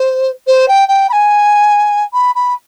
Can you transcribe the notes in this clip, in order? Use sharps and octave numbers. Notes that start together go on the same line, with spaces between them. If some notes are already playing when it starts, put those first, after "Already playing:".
Already playing: C5
C5
G5
G5
B5
G#5
B5
B5